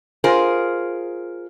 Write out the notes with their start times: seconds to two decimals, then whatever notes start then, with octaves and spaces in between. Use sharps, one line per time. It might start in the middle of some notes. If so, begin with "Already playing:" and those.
0.24 F4 G#4 A#4 C5